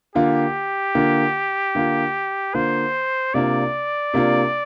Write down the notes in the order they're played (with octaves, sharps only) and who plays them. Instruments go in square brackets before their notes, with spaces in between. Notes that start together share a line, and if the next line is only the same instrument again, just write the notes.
[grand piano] D3 A#3 F4 [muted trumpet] G4
[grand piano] D3 A#3 F4
D3 A#3 F4
[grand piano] D3 A#3 F4 [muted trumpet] C5
[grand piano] C3 A#3 D4 F4 [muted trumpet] D5
[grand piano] C3 A#3 D4 F4